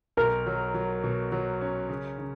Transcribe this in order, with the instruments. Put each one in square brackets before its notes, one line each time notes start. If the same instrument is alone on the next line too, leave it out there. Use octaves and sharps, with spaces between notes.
[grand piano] B1 [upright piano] A#4
[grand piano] F#3
F#3
B2
F#3
C#4
C#3
C#3